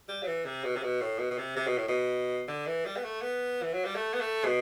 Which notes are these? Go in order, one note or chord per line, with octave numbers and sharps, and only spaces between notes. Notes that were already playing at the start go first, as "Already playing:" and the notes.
G3
F#3
E3
C3
B2
C3
B2
A2
B2
B2
C3
C3
B2
A2
B2
D3
E3
G3
B3
A3
B3
E3
F#3
G3
A3
B3
A3
B2